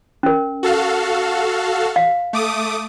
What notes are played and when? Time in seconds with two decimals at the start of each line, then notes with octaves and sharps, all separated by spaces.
0.23 C#4 A#4
0.63 F#4 A4 F5
1.96 F5
2.33 A3 D6 D#6